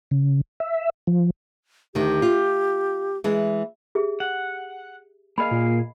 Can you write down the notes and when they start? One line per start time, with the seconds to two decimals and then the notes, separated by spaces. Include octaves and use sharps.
0.11 C#3
0.60 E5
1.07 F3
1.95 D2 D#3 G4
2.22 F4
3.24 E3 G#3
3.95 G4 G#4 E5
4.20 F#5
5.38 A#3 G#4 D#5 F5 B5
5.51 A#2